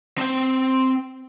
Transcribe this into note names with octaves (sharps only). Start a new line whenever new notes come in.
C4 G5